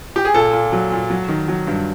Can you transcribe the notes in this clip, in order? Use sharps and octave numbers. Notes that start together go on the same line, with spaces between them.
G4
G#4
A#2 A4
A#2
F#3
A#2
F#3
D#3
F#3
G2